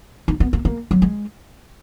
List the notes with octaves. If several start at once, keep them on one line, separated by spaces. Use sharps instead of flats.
D#4
B3
A#3
A#3
F#3
G#3